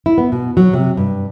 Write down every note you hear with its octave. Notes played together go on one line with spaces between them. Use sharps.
E4
B3
B2
F#3
C3
G2